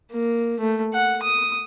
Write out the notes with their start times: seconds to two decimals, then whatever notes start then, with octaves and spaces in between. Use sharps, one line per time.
0.12 A#3
0.60 A3
0.94 F#5
1.23 D#6